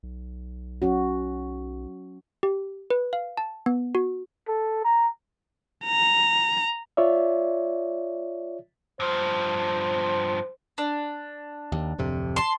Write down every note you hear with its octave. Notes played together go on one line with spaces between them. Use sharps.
B1
F#3 C#4 F#4
G4
B4
F5
A5
B3
F#4
A4
A#5
A#5
F4 C#5 D5 E5
G2 F3 C5
D4
D#2
D1 F2 C3
A5 C6